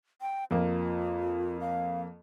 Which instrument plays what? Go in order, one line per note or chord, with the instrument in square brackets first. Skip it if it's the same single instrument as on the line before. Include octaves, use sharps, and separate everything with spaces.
[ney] G5
[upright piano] F2 A#3 [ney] F4
[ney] F5